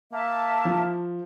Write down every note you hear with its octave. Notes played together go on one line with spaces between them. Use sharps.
A#3 E5 A5
F3